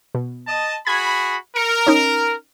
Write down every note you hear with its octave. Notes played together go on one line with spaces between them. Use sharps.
B2
D#5 A5
F#4 G#4 B5 G#6
A#4 C#7
C#4 D#4